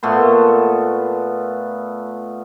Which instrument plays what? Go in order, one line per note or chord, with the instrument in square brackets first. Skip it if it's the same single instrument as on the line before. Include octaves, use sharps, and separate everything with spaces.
[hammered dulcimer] A#2 A3 B3 C6